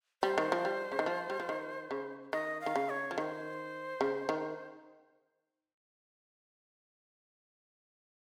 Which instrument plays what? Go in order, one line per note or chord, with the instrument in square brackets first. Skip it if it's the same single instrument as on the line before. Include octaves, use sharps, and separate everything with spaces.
[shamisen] G3 [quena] C5
[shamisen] D#3
F3
G3
C#3
D#3
F3
G3
F3
D#3
C#3
[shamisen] D#3 [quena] D#5
[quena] F5
[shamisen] D#3
C#3
[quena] C#5
[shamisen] F3
[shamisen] D#3 [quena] C5 C#5
[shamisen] C#3
D#3